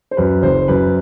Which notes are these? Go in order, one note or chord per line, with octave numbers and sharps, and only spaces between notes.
C5
F#2 B4
F#1 C5
F#2 B4